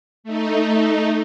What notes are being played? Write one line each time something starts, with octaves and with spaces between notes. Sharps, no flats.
A3 D#4